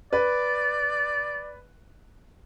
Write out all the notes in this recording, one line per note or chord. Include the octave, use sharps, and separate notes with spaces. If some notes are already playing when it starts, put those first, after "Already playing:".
B4 D5